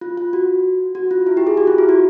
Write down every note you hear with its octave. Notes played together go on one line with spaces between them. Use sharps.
F4
F4
F#4
F#4
F4
E4
G4
G#4
F#4
F4
E4
F#4